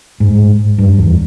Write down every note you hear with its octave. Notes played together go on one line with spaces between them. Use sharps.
G#2
G2
E2